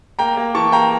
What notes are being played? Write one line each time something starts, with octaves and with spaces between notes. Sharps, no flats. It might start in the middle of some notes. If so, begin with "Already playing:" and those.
A#3 G5 A#5
A#3
E3 A5 C#6
A#3 G5 A#5